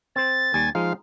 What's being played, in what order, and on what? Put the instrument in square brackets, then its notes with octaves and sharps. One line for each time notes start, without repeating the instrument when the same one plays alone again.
[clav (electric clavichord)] C4 C5 [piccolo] A6
[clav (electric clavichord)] D#2 G3 [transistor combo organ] G#5
[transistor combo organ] F3 F5 [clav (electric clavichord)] G#3 D#4